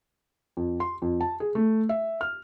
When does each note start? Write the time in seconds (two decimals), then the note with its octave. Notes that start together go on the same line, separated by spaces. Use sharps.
0.57 F2
0.80 C6
1.02 F2
1.21 A5
1.40 G#4
1.55 A3
1.89 E5
2.21 F6